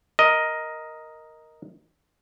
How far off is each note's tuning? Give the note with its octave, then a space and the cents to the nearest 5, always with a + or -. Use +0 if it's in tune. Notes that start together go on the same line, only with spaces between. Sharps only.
A#4 +0 D#5 +5